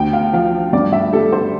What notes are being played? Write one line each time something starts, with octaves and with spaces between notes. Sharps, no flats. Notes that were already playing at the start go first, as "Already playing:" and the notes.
Already playing: D2 G5
F5
F3 F5
G2 D5
E5
G3 A4
C5